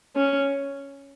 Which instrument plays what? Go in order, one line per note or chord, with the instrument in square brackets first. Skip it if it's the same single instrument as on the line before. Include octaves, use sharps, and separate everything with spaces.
[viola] C#4